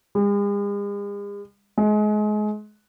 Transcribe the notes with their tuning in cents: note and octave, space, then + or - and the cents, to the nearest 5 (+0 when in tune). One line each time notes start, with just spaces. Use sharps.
G#3 -45
G#3 +30